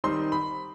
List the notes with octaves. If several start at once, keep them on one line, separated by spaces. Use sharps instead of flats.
D#3 G3 C4 D#4 C6
B5